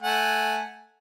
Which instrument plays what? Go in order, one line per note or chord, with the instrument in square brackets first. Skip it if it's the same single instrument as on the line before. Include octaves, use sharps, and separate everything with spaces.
[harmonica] A3 F#5 G#5